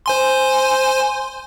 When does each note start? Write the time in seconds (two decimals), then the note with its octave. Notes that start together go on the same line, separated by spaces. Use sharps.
0.06 C5 G#5 C6